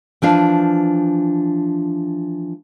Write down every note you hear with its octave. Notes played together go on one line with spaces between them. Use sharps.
E3 F3 D4 F5